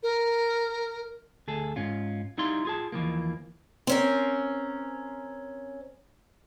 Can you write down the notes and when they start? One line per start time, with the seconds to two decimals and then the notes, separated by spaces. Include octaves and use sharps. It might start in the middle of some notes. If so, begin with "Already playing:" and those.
0.03 A#4
1.48 D2 G#4 A4
1.76 G#2 C#4 F4
2.38 G3 D#4 E4 F5 C6
2.65 F4 G#4 A5
2.92 D#2 E3 F3 A#3
3.87 C4 C#4 A#4